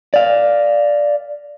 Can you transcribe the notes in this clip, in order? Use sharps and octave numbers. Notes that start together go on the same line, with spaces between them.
D5 F5